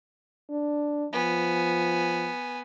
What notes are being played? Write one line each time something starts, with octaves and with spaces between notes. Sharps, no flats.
D4
F3 B3 G#5